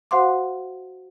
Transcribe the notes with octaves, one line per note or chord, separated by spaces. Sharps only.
F#4 C5 F5 F#5 C6 D6